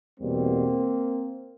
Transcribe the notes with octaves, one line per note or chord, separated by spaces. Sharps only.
E2 B2 G3 A#3 C4